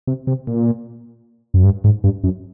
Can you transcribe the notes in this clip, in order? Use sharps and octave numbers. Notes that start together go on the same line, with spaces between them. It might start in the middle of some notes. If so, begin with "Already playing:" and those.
C3
C3
A#2
F#2
G2
G#2
G2
F#2